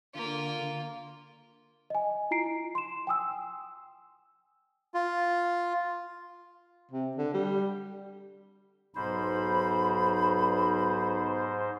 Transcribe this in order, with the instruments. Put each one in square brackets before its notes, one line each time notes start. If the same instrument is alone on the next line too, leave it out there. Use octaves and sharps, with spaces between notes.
[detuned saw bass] D3 [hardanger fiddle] A#3 F4
[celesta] D#5 G#5
E4 F4 A#5 C7 D7
C6 E7
G5 G#5 D#6 E6
[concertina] F4
[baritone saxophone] C3
D3
G3
[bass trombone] B1 [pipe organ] G#2 C5 [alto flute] B5